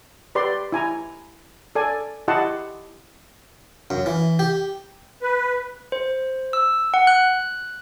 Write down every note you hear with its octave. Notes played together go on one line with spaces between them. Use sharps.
G4 B4 D5 C6
E4 G#5 A#5
A4 D5 G#5
E4 G4 D#5 F#5 A5 C6
F#2
E3
G4
B4
C5
E6
F#5
F#6